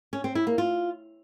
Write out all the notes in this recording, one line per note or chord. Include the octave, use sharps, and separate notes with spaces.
C#4
C4
E4
A#3
F4